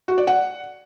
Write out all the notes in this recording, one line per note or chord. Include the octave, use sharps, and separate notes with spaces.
F#4
D5
F#5